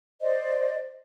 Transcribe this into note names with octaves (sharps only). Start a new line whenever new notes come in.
C5 D5 D#5